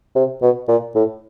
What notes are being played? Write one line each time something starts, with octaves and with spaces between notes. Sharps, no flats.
C3
B2
A#2
A2